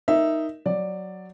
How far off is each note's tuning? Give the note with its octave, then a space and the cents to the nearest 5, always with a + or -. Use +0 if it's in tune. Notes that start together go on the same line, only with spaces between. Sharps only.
D#4 +0 A#4 +0 E5 +0
F#3 +0 D5 +5